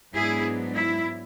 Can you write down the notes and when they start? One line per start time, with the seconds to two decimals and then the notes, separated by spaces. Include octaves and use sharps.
0.14 G#2 F#3 B3 D4 E4 G#4
0.76 E4